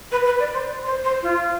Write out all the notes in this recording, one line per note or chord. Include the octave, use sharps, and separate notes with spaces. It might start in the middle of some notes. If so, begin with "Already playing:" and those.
B4
B4
D5
C5
C5
C5
F4